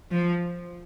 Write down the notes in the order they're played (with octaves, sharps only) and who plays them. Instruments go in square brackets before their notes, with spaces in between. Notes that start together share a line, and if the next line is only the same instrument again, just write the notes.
[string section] F3